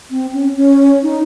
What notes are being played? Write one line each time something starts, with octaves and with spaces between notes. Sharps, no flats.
C4
C#4
C#4
D#4